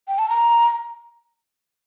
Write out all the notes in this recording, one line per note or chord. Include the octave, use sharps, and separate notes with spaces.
G5
A5
A#5